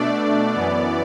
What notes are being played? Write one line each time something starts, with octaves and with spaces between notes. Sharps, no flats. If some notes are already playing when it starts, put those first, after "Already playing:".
Already playing: B2 A3 D4 D5
F#2 E3 B3